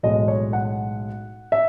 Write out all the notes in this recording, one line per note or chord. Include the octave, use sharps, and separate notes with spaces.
B1 A2 E3 G#3 D#5
C#5
F#5
E5